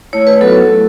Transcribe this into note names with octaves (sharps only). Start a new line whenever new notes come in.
A3 E4 C#5
B4
F#3 B3 D#4 F#4 A4
A3 E4